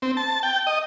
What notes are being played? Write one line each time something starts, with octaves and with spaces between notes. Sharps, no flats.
C4
A5
G5
D#5